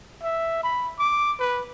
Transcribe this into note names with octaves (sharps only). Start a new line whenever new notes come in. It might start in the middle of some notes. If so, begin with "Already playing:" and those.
E5
B5
D6
B4